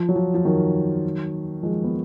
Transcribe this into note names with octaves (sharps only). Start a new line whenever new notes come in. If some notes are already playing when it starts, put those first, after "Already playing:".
Already playing: F3
F#3
F3
F3
D#3 F#3
F3 G#3
B3